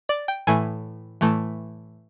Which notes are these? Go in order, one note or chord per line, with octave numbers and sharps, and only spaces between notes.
D5
G5
A2 E3 A3 G#5
A2 E3 A3